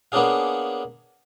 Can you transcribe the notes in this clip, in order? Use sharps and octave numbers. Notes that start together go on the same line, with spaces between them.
A#3 B3 C#4 D4 G#4 F5